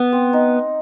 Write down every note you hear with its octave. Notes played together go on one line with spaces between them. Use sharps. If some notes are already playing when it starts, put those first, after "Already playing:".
Already playing: B3
C4
D#4